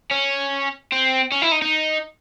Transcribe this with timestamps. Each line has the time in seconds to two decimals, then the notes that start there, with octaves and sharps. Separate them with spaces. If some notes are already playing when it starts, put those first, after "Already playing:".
0.11 C#4
0.92 C4
1.32 C#4
1.42 E4
1.52 D#4
1.62 D#4